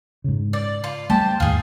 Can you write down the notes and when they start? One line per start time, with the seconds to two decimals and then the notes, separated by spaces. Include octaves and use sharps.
0.24 G#2 C#3
0.53 D5
0.84 F4
1.10 G3 A3 G4 C5 A5
1.40 D#2 G#2 D#3 F4 G#4